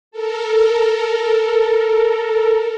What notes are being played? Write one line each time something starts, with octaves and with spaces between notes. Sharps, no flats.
A4 A#4